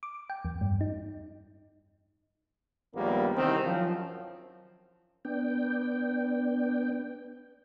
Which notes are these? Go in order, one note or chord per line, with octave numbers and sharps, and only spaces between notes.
D6
G5
E2
G2
D#4
A#1 D#2 G3 G#3 A#3 B3
C2 D#3 E3 C4
F#2 F3
B3 D4 G5